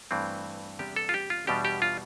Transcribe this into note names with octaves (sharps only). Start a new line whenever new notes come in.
G2 E3 A3 C4
E2 C3 G3 B3 D4 G4
A4
F4
G4
F4
E2 B2 G3 D4 G4
G4
F4